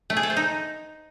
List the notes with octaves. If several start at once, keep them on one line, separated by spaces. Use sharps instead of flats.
A3
G#4
A4
C5
D#4